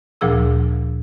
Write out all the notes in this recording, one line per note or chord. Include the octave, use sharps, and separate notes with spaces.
D2 A#2 F3 G#4 E6